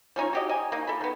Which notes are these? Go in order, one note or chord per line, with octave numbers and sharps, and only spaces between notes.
F3 C#4 D#4 C#5
F#4 G4 D#5
D#5 G#5
A#3 D#4
A4 B5
D#3 B3